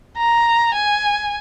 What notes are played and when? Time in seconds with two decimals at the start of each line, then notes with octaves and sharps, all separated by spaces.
0.17 A#5
0.74 G#5